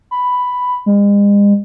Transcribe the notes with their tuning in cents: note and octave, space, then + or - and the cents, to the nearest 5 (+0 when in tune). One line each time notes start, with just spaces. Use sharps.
B5 +5
G#3 -40